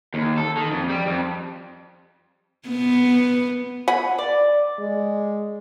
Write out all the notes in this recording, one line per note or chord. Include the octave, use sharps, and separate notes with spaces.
D#2
A4
D#3
F2
G3
F2
B3
F#5 G#5 B5
D5
G#3